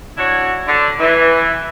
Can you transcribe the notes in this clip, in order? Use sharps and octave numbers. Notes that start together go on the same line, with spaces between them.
D4 E4 F#4 C#5
D3
E3